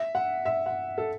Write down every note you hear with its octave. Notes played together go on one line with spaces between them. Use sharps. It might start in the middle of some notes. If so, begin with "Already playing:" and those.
Already playing: E5
F#5
E5
F#5
A4